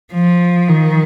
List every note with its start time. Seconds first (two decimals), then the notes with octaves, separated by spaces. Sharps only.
0.13 F3
0.68 D#3